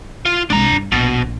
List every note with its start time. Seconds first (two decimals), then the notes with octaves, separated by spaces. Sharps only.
0.25 F4
0.50 C2 G#3 D4 A#5
0.72 G2
0.92 A#1 B2